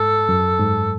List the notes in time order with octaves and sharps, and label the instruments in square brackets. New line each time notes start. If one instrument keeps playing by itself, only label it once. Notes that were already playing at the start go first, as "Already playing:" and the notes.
Already playing: [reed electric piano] G#2 [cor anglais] A4
[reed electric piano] F#2
G#2